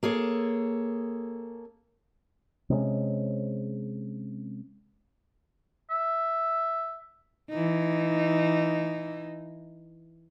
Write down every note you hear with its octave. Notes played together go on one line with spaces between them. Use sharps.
A#3 G#4 A4 C#5
C3 G#3 B3 C#4
E5
E3 D#4